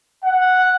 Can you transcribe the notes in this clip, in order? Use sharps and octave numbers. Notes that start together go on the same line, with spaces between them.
F#5